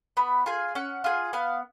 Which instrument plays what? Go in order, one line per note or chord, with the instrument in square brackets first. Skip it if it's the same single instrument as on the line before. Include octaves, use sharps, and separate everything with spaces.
[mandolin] B3 B5
F4 G#4 G#5
C#4 F#5
F4 G#4
B3 F5